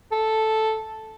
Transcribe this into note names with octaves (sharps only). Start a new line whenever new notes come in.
A4